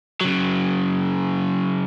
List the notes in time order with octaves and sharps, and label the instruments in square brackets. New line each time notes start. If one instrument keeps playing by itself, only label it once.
[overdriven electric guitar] C#3 F#3